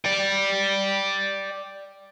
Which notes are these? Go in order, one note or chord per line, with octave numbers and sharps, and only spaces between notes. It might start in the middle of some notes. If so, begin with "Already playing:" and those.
D5 G5